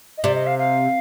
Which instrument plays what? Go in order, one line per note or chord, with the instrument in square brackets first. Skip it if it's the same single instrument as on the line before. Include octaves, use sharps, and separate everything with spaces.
[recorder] D#5
[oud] C3 [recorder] D5
[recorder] D#5
F5
F5